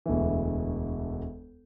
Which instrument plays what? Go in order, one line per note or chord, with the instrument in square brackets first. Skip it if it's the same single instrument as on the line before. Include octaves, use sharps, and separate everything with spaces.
[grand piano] E1 D2 E3